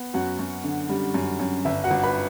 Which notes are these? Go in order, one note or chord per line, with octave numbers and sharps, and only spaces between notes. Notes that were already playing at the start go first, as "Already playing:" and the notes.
Already playing: B3
F#2 F#4 F#5
F#2
D3
G3
F#2
F#2
G1 E5
F#4 F#5
G1
B4 B5